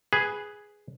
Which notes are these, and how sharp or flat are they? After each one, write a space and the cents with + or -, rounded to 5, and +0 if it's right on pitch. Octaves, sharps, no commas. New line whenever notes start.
G#4 +0 B4 +0